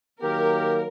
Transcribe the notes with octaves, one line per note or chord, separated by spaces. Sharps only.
D#3 F#3 A#3 G4 A#4